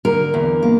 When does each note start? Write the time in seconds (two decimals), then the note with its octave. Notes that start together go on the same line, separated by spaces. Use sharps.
0.05 D3 A#4
0.34 E2
0.63 A#3